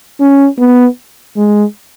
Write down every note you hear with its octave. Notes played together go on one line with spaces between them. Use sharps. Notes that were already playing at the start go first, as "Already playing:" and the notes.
C#4
B3
G#3